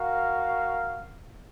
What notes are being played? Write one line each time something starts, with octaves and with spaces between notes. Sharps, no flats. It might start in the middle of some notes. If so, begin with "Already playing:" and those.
Already playing: F#4 A#4 F5